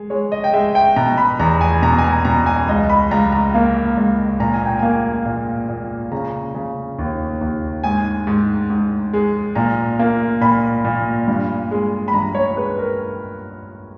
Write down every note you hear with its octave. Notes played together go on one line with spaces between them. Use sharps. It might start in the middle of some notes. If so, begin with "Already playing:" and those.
Already playing: G#3
G#3 C#5
D#5
G5
G#3 E5
G5
B2 A#5
B5
E2 A#5
G#5
B2 A#5
G#5
A#5
B2 A#5
G#5
C#2 D#5
B5
C#2 A#5
A#5
A#3
C#2
A#2 A#5
G#5
G5
A#3 G#5
A#2
A#2
C#3 A#5
C#3
D#2
D#2
G#2 G#5
G#2
G#2
G#3
A#2 A#5
A#3
A#2 B5
A#2
G2
G#3
B5
G2 A#5
C#5
G#3 B4
A#4